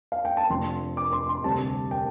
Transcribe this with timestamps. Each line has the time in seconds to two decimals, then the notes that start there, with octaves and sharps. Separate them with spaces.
0.12 F5
0.25 G5
0.37 A5
0.49 F1 F2 F3 D4 C6
0.97 D6
1.13 C6
1.29 C6
1.44 D2 C3 G3 C4 A5
1.91 G5